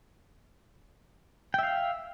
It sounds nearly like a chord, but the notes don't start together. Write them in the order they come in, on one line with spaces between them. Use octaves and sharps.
G5 E5 F5